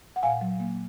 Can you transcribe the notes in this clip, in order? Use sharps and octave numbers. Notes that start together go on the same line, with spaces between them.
F#5
A#2 F5 G#5
F#3
A#3